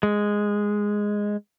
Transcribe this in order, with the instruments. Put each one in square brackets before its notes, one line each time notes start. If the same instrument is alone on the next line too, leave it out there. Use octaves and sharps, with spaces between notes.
[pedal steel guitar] G#3